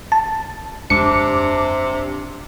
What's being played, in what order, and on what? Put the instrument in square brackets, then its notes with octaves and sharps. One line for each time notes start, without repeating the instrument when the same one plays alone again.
[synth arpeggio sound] A5
[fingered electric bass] G1 F2 G#3 [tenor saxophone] C3 [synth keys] D4 D6 [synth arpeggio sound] C#7